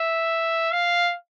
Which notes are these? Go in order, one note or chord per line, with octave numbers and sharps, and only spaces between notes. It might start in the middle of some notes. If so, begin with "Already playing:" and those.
Already playing: E5
F5